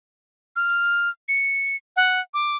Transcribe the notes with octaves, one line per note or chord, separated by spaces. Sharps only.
F6
C#7
F#5
D6